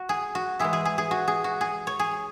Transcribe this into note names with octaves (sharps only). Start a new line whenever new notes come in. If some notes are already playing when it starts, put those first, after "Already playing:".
Already playing: F#4
G#4
F#4
E3 G#3 E4 G#4
G#4
G#4
G#4
F#4
G#4
F#4
G#4
C#5
G#4